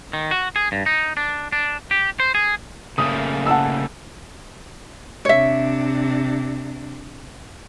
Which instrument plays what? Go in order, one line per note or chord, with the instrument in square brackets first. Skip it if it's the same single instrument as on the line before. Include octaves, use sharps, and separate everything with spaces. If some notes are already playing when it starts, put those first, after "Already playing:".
[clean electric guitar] D#3
F#4
G#4
G2
D#4
D4
D4
G4
C5
G#4
[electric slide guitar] C#3 A3 A#3 [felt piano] D#6
[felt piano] F#5 A5 E6
[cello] C3 D4 [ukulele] C#5 E5